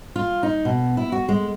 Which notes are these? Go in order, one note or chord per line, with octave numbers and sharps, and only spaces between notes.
F4
D#4
B2
E4
F#4
G#3